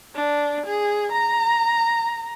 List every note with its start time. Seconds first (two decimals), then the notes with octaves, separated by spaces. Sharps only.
0.15 D4
0.66 G#4
1.12 A#5